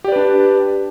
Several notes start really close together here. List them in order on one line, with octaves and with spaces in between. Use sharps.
G4 D5 B4 D4